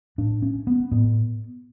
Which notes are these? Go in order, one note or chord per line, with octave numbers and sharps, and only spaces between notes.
A2 D4
C#4
B3
A2 B3